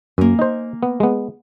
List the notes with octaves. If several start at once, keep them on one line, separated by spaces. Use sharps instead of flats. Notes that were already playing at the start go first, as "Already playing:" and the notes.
F#2 A#3 G#5
D#4 C5
B3
G#3 B3